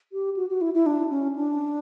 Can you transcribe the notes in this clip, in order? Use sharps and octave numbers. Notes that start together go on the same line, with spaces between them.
G4
F#4
F#4
E4
E4
D4
C#4
D4